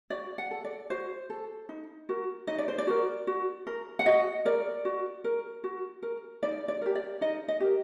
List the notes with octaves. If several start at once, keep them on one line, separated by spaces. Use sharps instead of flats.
F#4 D5
F#5
A4
D5
F#4 C5
A4
D#4
F#4 A#4
D#4 D#5
D5
C5
D5
F#4 A#4
F#4
A#4
F#5
F#4 D#5
A#4 D5
F#4
A#4
F#4
A#4
D#4 D5
D5
G4 A#4
D5
D#4 D#5
D#5
G4 A#4